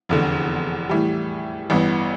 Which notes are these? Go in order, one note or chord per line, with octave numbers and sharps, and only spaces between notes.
F1 E2 D3
A2 E3 G3
A1 G2 E3 B3